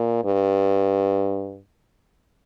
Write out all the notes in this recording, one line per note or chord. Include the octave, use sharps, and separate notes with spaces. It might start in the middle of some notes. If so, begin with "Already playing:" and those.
Already playing: A#2
G2